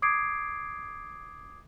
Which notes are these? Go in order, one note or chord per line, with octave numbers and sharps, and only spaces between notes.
D6 D#6 G#6 C7 D7